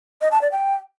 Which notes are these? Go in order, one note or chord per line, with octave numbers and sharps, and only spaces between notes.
D#5
A5
D5
G5